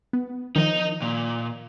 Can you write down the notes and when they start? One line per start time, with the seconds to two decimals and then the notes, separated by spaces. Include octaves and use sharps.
0.13 B3
0.56 D#3 F3 D#4 D#5
1.02 A#2